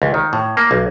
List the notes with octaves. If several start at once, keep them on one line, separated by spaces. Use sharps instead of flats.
C#2
D#3
A2
A#3
B1